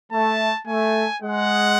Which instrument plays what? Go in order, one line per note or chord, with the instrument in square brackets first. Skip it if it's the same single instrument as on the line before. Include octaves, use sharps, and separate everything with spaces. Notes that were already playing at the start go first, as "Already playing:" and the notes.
[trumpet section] A3 [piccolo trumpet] A5
[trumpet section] A3 [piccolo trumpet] G#5
[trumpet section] G#3 [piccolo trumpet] F#5